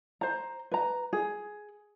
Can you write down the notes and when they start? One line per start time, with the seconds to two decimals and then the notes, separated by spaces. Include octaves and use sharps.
0.21 C5 A#5
0.71 B4 A#5
1.13 G#4